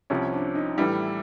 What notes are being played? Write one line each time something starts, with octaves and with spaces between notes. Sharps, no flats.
C2 C3 F3 C#4
D4
D#4
A2 E3 G3 E4